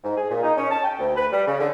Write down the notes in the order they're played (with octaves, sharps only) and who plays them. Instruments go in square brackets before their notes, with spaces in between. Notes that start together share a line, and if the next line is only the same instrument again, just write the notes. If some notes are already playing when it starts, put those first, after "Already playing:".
[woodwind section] G#2
G#4
A#2
D#4
C#4
A5
G5
D2
B4
G3
C#3
D3